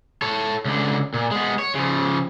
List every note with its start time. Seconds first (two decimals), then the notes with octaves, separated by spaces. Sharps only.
0.22 A4 C#5
0.65 C#2 D3
1.14 A#2
1.31 G#3 B3
1.59 C#5
1.75 C#3 F3